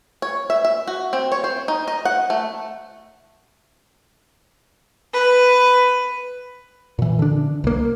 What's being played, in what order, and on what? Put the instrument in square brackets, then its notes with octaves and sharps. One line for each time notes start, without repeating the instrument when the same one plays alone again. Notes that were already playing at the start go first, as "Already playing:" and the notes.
[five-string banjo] C#5
E5
E5
F#4
C4
C#5
C5
D#4
D#5
F#5
A3
[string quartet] B4
[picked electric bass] A#2 E3
D3 D4
C2 A#3